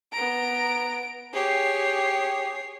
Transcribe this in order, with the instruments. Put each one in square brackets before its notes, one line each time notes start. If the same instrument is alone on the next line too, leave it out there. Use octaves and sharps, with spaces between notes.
[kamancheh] B3 A#5 [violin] D7
[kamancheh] G4 G#4 [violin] C#5 C7